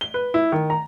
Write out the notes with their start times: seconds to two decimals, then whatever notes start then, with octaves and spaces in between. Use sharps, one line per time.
0.01 G7
0.14 B4
0.34 E4
0.52 D#3
0.70 A#5